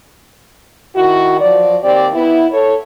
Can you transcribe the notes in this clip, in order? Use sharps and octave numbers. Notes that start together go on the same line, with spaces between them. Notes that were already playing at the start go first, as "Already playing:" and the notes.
D#3 E4 F#4
F3 F#3 D5
D#2 C4 G4 D5
B3 E4
A4 C#5